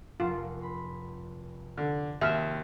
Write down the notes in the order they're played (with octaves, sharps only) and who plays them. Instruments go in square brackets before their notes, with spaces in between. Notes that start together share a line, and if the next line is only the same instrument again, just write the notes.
[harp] F1 A#4 F#5 [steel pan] F4
[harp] B5 C6
[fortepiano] D3
[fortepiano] D#2 F6 [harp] C4 F#4 A#4 [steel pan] E5